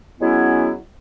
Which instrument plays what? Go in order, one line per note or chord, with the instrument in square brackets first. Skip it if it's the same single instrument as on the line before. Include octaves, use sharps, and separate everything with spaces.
[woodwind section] F#3 G#3 B3 C#4 E4